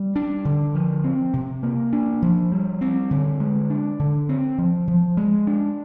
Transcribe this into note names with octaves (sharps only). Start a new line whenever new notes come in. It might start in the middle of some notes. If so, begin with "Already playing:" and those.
Already playing: G3
D4
D3
F3
C4
C3
A#3
D4
F3
G3
C4
D3
G#3
D4
D3
C4
F3
F3
G#3
D4